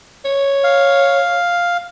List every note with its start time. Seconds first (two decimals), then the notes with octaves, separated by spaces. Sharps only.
0.25 C#5
0.64 F5